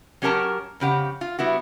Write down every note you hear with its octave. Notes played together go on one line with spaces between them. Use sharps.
F#3 C#4 G4 A#4 A5 A#5
F2 C#3 G4 F#5
F4
G3 B3 E4 F#4